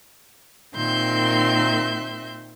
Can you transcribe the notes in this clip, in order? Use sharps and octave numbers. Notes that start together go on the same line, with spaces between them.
A#2 D#3 C4 E5 C6 G6